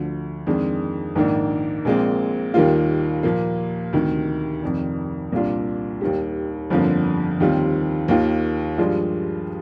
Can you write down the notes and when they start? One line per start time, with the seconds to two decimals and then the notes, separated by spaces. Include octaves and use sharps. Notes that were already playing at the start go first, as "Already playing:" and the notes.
Already playing: D2 D3 F3
0.47 F2 D#3 G#3 D4
1.15 A#1 G#2 D#3 A#3 D4
1.85 A#1 A#2 G#3 C4
2.54 D#2 D#3 G3 A#3 F4
3.23 A#2 F3 A#3
3.93 D2 C3 D#3
4.62 F1 F2 D#3
5.32 C2 A#2 G3 D4 F4
6.01 D#2 D#3 G3
6.70 G1 F2 D3 F3 A#3
7.40 D#2 D#3 G3 C4 F4
8.08 D#2 D#3 A#3 F4
8.78 G2 F3 G#3 D4 F4